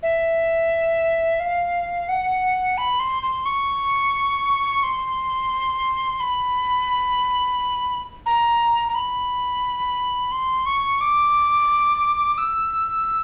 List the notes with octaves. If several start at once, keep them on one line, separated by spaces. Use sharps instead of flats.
E5
F5
F#5
B5
C6
C6
C#6
C6
B5
A#5
A#5
B5
C6
C#6
D6
E6